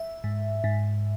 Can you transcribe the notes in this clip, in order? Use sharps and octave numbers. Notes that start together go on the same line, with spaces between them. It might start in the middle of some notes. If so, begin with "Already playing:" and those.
Already playing: E5
G#2
G#2